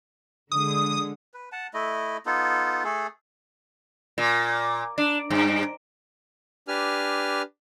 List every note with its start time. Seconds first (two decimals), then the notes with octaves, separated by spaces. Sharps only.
0.52 D3 G#3 D#6
1.34 B4
1.52 F#5 A5
1.74 A3 E4 D#5
2.26 B3 D#4 F4 A4
2.84 A3 G#4 A4
4.18 A#2
4.98 D4
5.30 G2
6.68 D4 G4 B4 G#5 F6